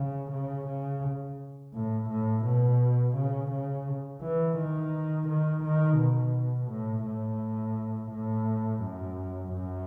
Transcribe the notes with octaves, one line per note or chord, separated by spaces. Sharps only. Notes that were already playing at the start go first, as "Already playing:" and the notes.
Already playing: C#3
C#3
C#3
A2
A2
B2
C#3
C#3
E3
D#3
D#3
D#3
B2
A2
A2
A2
F#2
F#2